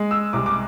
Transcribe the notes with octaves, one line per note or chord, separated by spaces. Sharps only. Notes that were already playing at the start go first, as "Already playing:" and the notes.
Already playing: G#3
E6
C2 D6
D6